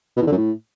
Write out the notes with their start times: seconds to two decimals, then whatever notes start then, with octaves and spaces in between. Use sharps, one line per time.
0.17 B2
0.22 E2
0.27 D3
0.32 F#2
0.37 A2